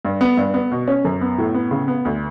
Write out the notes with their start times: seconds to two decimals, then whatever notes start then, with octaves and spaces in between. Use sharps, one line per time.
0.05 G2
0.21 B3
0.37 G2
0.54 B3
0.71 B2
0.88 C#4
1.05 F#2
1.21 B3
1.38 A2
1.54 B3
1.71 C#3
1.88 B3
2.05 D2